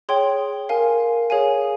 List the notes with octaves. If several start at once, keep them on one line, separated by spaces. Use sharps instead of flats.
G#4 C#5 G5 C6
A#4 F5 G#5
G#4 C#5 F5 G#5